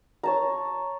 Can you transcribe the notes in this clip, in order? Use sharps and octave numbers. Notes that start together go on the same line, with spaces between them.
C#5 A5 A#5